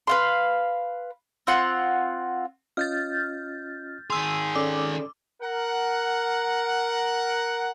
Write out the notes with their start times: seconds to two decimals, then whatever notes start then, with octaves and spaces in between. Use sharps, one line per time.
0.07 B4 F5 C6
1.47 C4 F4 F#5
2.77 C#4 F4 D#5 F6 G6 A6
4.10 D#3 G#4 C6 E6
4.55 C#4 A4 D5 D6
5.41 A#4 F#5